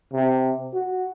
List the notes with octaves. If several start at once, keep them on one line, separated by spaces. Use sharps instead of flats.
C3
F#4